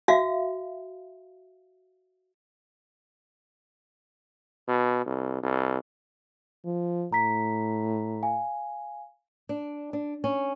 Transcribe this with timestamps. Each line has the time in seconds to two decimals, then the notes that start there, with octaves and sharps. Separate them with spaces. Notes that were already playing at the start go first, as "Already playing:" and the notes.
0.08 F#4 E5 F5
4.68 B2
5.06 C2
5.43 C2
6.65 F3
7.12 A2 A#5 B6
8.23 F5 G#5
9.49 D4
9.93 D4
10.24 C#4